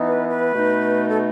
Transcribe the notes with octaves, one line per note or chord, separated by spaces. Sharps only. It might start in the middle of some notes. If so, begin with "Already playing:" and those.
Already playing: E3 B3 D#4
B4
B4
B2 A3 D#4
A4